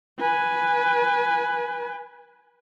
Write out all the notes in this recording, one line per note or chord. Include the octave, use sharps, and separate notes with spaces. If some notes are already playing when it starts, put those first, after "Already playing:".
B4 G#5